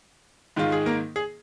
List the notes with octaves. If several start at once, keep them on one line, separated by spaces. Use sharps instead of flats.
G#2 D#3 G#3 F4
G#4
A#3 A#4
G#4